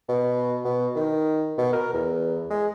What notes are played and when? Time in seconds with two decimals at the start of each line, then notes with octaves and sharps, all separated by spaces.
0.09 B2
0.65 B2
0.96 D#3
1.58 B2
1.73 A#4
1.93 E2
2.50 G#3